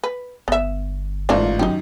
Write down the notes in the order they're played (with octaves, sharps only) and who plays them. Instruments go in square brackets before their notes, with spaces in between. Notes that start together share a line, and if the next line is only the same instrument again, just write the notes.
[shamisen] B4
[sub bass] G1 [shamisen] B3 E5
[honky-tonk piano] A1 G#2 F4 [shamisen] A3 A#3 D4
[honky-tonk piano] F#2 D#3 [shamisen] D#4 G4